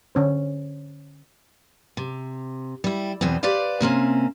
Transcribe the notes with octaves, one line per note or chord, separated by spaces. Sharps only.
D3 C#4 C5
C3
G3 E4
E2 B2 B3 C4
G4 B4 C5 D5 F5
C3 A#3 C4 C#4